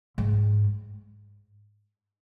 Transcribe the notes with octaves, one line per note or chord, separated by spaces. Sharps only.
G#2